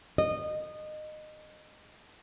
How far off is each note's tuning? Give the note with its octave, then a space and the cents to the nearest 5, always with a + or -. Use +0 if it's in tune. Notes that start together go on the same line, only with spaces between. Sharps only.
D#5 -20